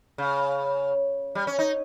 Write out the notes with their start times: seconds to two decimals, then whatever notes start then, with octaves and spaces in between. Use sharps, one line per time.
0.18 C#3
1.35 G3
1.47 C#4
1.59 D#4